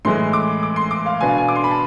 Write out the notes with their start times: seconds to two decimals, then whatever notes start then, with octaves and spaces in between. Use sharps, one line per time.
0.05 A2 E3 G#3 C6
0.33 D6
0.63 D6
0.76 C6
0.91 D6
1.06 F5
1.21 B2 B3 D4 G#5
1.29 F5
1.38 G#5
1.48 D6
1.56 C6
1.64 B5
1.71 A5